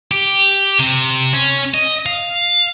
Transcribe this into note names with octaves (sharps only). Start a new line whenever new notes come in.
G4
C3
C#4
D#5
F5